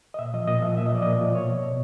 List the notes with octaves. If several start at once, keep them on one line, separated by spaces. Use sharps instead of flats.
D#5
A#2 E5
F3 D#5
A#2 D#5
F3 E5
A#2 E5
D#5
F3 D5
D#5
A#2
F3
B2 C#5
B2